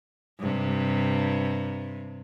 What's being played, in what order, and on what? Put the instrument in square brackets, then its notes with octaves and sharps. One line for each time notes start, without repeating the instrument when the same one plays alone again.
[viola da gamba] G2 C3